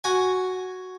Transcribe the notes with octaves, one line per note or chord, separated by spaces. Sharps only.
F#4 G#5